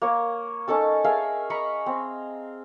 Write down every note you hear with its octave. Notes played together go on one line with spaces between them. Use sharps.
A#3 C#5
C#4 D#4 A4 A5
G#4 A#4 E5 F5
D#5 A#5 B5 C#6
C4